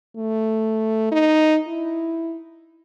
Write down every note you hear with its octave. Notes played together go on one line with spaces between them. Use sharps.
A3
D#4
E4